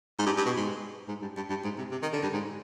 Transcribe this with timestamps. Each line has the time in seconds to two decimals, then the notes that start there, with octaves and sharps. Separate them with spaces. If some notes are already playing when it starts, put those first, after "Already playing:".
0.19 G#2
0.26 G2
0.37 G2
0.46 B2
0.57 G#2
1.08 G#2
1.22 G2
1.37 G2
1.49 G2
1.64 G#2
1.78 C3
1.91 C3
2.02 D#3
2.13 D3
2.23 G2
2.33 G#2